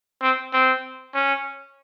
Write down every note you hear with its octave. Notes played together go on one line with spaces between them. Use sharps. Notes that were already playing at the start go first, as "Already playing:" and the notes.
C4
C4
C#4